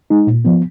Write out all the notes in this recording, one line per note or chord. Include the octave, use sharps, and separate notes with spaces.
G#3 D#4
A#2
F3 B3